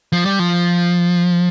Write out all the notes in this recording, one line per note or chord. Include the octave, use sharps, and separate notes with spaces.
F3
G3
F3